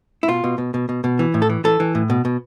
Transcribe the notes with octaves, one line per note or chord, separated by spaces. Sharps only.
E4
B2 F4
B2
B2
B2
B2
B2
E3
A2
A4
E3
E3 A4
E3
A2
B2
B2